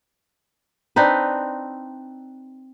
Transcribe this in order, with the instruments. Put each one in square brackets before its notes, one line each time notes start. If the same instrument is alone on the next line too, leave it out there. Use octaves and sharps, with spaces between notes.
[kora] C4 D4 D#4 B4